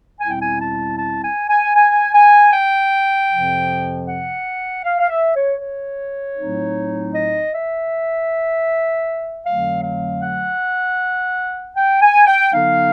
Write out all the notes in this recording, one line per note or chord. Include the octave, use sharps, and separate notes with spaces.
E2 B2 G3 C4 E4 G#5
G5
G#5
A5
A5
G#5
G#5
G#5
G#5
G5
F2 C3 F3
F#5
F5
F5
E5
C#5
C#5
A2 F#3 A3 C4 D#4
D#5
E5
F2 D3 F#3 A3 F5
F5
F#5
G5
G#5
G5
D3 F#3 B3 D#4 F5